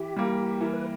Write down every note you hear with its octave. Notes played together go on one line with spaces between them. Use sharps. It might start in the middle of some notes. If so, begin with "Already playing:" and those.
Already playing: E3 G4
G3 A#3
E3 A#4
B4